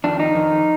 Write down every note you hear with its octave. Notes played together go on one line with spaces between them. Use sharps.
F2 D#3 D4
D#4
F2 D#3